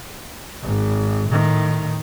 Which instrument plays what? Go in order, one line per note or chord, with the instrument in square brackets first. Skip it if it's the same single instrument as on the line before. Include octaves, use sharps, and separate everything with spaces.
[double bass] G#1
A2 D#3